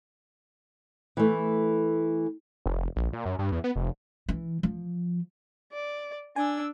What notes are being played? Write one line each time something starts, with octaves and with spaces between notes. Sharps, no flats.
E3 A3
F1
A#1
A#2
F#2
G2
E2
B3
F1
E3
F3
D5
D4 G#5 E6